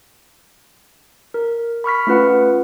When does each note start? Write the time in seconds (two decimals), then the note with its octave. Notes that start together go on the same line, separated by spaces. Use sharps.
1.34 A#4
1.84 B5 C#6 F6 B6
2.07 A3 C#4 F4 B4 F#5